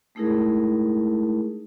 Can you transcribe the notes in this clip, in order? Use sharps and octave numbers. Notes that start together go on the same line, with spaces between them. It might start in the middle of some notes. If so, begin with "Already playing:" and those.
G#3 A3 D#4 E4 G#4 A#4